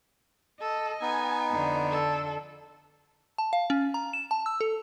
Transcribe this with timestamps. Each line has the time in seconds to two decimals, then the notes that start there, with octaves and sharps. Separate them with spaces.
0.61 A4 D#5
1.02 B3 D#4 G#5
1.51 F2 D3
1.91 A4
3.38 A5
3.53 F5
3.70 C#4
3.94 A#5
4.13 E7
4.31 A5
4.46 E6
4.61 A4